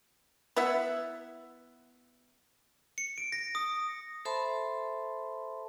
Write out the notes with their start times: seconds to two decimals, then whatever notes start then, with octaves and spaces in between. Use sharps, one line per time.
0.56 B3 E4 E5 F#5
2.98 C#7
3.18 D7
3.32 A#6
3.55 D#6
4.25 A4 C5 E5 A5 B5 C6